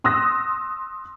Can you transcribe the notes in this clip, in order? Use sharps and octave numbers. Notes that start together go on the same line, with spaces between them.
C6 D#6 E6 F#6 A#6